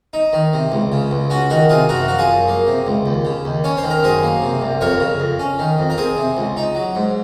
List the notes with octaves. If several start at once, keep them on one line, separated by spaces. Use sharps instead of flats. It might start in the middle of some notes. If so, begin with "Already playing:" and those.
D#4
D#3
C3
C#2
C#3
C#2
C#4 F#4
D#3 F#4
C3 F4 G#4
F#2 F#4 A#4
F3 F#4
F4 G#4
F#2
A#3
C3
C#2
D#2
C#3
D#2
C#4 C#5
C5
D#3
A#4
F#2 G#4 C5
A#3
C3
C2
F2 A#4 C#5
C#3
F2
C#4
D#3
F2
A#4
C4 G#4 C5
C3
C#2
D#4
F#3
G#2